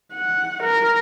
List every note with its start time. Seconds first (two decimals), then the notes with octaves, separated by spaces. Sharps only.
0.13 F#5
0.64 A#4